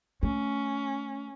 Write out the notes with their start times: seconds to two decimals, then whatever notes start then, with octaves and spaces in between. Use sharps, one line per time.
0.23 A3 C#4